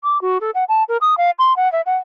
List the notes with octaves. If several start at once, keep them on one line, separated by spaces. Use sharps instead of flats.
D6
F#4
A4
F#5
A5
A#4
D#6
F5
C6
F#5
E5
F#5